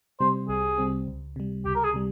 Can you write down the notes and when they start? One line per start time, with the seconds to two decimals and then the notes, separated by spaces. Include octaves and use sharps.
0.20 C3 G3 C4 C5
0.49 C2 G#4
0.78 C3 G3 C4
1.08 C#2
1.36 C3 G3
1.65 C#2 G4
1.75 A#4
1.84 G#4
1.94 C3 G3